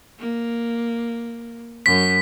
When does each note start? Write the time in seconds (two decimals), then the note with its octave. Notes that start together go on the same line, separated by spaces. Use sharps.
0.19 A#3
1.86 F#2 B6